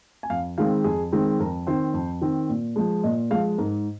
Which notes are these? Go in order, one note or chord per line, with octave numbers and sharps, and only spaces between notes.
G#5
F2 F5
D#3 G#3 C4 F5
F2 G#4
D#3 G#3 C4
F2 A#4
D#3 C4 C5
F2
D#3 C4
A#2
F3 G#3
A#2 D#5
F3 G#3 F5
G#2 A#4